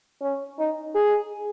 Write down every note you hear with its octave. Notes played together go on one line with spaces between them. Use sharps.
C#4
D#4
G#4